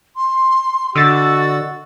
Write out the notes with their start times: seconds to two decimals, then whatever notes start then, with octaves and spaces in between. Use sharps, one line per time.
0.16 C6
0.95 D3 F#4 D#5 E6 A6